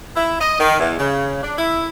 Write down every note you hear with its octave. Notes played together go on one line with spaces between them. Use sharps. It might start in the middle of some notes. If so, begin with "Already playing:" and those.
E4
D#5
D#3
E2
C#3
D4
E4